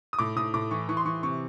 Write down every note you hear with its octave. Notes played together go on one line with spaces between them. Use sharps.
D#6
A2 D6
A2 D#6
A2 D6
E3 C#6
E3 C#6
C6
E3 C#6
C3 C#6